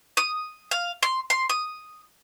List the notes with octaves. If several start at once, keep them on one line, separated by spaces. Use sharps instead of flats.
D#6
F5
C6
C6
D#6